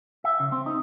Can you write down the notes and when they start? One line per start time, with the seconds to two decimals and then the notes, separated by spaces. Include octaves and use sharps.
0.24 E5
0.40 C#3
0.52 C4
0.66 D#4